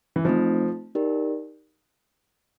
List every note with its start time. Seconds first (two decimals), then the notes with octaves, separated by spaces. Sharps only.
0.16 E3
0.25 F3 A3 C4 D#4
0.95 D#4 G4 A#4 D5